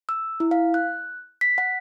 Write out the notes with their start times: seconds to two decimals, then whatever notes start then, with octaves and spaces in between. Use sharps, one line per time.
0.09 E6
0.40 E4
0.51 F5
0.74 F#6
1.41 B6
1.58 F#5